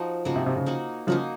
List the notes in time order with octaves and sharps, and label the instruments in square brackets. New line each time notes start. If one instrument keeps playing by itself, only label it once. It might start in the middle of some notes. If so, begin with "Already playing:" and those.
Already playing: [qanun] F3 D#4 F#4
[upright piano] C#3 [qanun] F3 A#3 D#4 F#4
[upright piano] C3
C3
C#3
[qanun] A#3 D#4 F#4
[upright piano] C#3 F3 [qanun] A#3 D#4 F#4